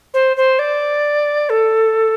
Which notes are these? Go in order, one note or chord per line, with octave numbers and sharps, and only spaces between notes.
C5
C5
D5
A4